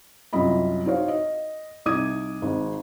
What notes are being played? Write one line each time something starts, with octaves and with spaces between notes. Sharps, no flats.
C2 F#2 F4 D#5 B5
D#4 F#4 C5 C#5 F5
D#5
C2 D#4 D6 D#6 G#6 D#7
G#1 G#2